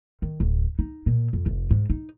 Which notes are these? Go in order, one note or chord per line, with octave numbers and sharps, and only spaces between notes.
D#3
D1
D#4
A#2
F2
F1
G#2
D#4